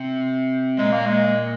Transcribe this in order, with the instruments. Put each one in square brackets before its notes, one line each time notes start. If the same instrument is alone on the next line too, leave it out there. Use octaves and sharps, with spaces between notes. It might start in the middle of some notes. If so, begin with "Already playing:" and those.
Already playing: [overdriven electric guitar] C3
[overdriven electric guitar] A#2 [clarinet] G#3
[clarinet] A#3
G#3